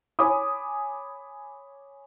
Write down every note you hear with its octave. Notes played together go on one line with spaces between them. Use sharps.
C#5 G#5 B5 D6 D#6